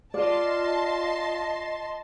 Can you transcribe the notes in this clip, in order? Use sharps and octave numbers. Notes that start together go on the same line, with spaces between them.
F4 D5 D#5 A5 C6